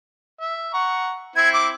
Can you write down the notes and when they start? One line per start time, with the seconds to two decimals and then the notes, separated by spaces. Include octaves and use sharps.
0.40 E5
0.74 F#5 A#5 C#6
1.36 C4 E4 G#6
1.53 D6